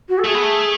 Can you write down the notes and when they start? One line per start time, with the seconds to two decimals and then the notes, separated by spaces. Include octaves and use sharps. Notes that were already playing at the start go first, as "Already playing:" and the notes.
0.08 F#4
0.18 A4
0.24 A3 G#4
0.34 B3
0.42 A3